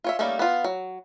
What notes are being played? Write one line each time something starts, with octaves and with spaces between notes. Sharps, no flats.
F4 C#5 E5
G3 A3 A#3 C#4 D#4
B3 F4
F#3